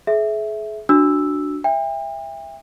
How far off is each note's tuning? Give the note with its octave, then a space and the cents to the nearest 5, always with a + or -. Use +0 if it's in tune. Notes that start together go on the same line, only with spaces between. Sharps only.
G#4 +40 E5 -5
D4 +0 F#4 -5 E6 +0
E5 +5 G5 +40